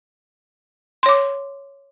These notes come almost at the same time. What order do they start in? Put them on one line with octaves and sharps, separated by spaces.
C6 C#5 D6